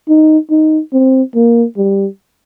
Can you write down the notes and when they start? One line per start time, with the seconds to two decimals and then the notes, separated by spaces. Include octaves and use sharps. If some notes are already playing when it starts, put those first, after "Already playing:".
0.09 D#4
0.51 D#4
0.93 C4
1.35 A#3
1.77 G3